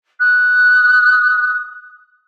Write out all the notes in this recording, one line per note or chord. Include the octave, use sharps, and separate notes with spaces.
D#6 F#6